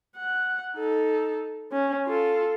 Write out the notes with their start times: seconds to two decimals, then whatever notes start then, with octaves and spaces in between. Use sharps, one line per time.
0.18 F#5
0.76 D#4 A4
1.72 C#4
2.07 F4 A4